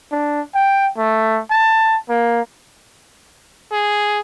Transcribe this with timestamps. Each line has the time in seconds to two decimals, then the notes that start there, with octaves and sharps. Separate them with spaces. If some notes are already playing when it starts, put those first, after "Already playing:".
0.12 D4
0.54 G5
0.97 A3
1.50 A5
2.09 A#3
3.72 G#4